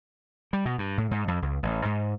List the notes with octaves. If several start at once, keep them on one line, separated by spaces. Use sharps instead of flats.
G3
B2
G2
A2
G#2
F2
C#2
A1
G#2